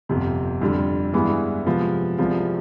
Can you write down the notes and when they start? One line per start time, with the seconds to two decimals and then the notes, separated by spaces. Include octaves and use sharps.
0.09 G1 F2 C3
0.61 F2 D3 G3
1.14 G2 E3 G#3 B3 E4
1.66 C3 F3 G#3 B3
2.18 C2 C3 F3 G#3 B3